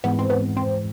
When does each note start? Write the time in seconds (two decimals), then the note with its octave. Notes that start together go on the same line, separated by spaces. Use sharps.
0.04 G#2 E3 G#3 B3
0.19 C4
0.30 B3
0.57 C4